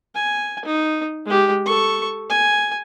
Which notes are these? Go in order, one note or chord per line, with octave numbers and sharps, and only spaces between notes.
G#5
D#4
G#3 G4
A4 C#6
G#5